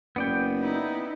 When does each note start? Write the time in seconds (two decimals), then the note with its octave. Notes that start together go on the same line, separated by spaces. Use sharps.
0.16 F#1 B3 D5 G5
0.59 D#4 E4